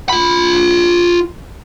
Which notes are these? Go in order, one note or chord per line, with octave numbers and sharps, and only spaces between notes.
F4 B5